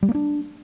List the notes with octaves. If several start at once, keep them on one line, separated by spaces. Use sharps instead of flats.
G3
A#3
D4